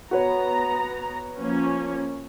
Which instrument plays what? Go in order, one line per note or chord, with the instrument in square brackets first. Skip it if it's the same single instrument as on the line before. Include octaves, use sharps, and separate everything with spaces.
[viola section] B3 A#5 [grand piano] F#4 B4 C#5
[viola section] F3 A#3 C#4